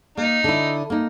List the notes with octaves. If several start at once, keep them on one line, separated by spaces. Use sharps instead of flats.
A#3 D#4
D3 E4
A#3 D#4